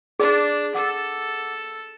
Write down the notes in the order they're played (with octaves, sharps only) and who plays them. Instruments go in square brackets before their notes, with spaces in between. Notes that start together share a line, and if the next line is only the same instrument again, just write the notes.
[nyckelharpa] D4 [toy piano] G#4 [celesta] D5
[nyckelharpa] A4 [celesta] F#5 D6